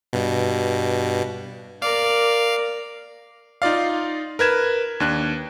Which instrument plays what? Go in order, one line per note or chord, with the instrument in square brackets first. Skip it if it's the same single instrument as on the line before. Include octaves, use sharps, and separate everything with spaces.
[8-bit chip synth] G2 B2
[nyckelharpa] A#4 D5 [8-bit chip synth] F5
[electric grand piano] D#4 F4 D5 F5
A#4 B4 G#6 E7
D#2 D4 F#6